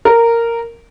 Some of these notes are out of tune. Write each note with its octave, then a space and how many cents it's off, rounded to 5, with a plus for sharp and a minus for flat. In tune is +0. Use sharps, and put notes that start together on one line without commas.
A#4 -10